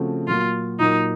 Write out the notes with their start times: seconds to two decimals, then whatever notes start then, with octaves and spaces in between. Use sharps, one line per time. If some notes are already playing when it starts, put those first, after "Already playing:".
Already playing: C#3 F3 A3 C4 F#4
0.27 A#2 F#3 A#3 F4
0.79 A#2 F#3 A#3 D#4